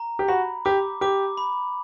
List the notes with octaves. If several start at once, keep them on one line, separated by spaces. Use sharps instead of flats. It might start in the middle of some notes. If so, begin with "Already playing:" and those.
Already playing: A#5
G4
F#4 B5
G4 D6
G4 D6
B5